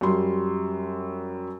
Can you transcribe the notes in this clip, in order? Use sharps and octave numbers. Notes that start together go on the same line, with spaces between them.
F#2 G3 C6